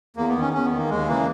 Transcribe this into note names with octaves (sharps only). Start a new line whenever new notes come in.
E2 A#3
B3
D#3
C#4
E2 C#4
B3
D#3
A#3
D#2 G#3
C#3 E3 A#3